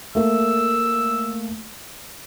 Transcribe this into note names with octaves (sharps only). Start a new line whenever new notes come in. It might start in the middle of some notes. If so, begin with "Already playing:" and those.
A3 A#3 E6